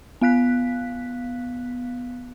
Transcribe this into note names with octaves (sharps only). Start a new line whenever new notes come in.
B3 F5 F#6 B6